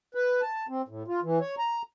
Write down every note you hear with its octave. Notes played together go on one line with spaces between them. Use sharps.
B4
A5
C4
A2
F4
E3
C#5
A#5